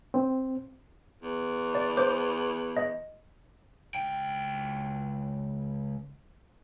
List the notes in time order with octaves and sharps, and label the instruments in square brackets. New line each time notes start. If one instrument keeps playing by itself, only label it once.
[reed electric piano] C4
[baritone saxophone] E2
[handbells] D5
C5 D6
D#5
[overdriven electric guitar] C#2 G5